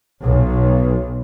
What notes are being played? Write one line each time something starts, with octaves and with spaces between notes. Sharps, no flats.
B1